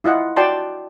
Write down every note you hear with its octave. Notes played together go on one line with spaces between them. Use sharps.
E4 F4 D#5 F#5
F#4 D5 G5 A5 C6